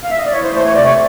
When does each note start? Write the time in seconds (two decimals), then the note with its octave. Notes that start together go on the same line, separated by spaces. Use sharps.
0.04 F5
0.10 E5
0.18 D#5
0.26 D5
0.33 E3 C#5
0.43 C5
0.54 A3 C5
0.65 C#5
0.75 C3 D5
0.85 C#5